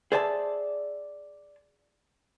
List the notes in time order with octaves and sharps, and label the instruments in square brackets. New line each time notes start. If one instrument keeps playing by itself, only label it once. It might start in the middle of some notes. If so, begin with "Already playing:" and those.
[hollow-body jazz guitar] G#4 C5 D5 E5 G#5 A5